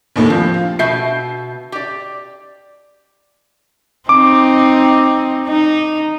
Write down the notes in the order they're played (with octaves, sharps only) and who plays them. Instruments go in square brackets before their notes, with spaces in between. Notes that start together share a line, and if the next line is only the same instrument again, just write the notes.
[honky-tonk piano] A#1 D#2 A2
[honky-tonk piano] F3 [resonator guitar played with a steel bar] C4
[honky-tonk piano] F4
[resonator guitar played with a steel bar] B2 E5 A5 [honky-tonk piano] G6 C7
[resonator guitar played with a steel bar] G4 D5
[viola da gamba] C4 D#4 [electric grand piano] D6
[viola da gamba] D#4